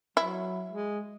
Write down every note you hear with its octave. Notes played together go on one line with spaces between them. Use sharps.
F#3 E4
G#3